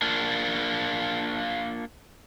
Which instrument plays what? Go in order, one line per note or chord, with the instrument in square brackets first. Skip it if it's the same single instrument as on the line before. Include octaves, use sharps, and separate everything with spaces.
[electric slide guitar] A#3 D4 F4